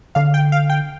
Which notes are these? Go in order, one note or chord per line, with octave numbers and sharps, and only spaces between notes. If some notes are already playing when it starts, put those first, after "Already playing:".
D3 F5
G5
F5
G5